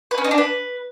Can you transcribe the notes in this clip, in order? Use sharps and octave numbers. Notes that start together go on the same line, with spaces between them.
B4
C#4
D#4
D4
B4